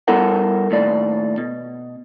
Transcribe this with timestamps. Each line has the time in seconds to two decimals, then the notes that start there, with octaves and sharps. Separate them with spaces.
0.08 G3 B3 E4 A4 A#4 F#5
0.71 D#2 A2 D5
1.38 B2